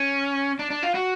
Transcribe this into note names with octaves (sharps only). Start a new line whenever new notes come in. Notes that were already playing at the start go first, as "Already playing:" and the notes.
Already playing: C#4
D4
D4
F4
F#4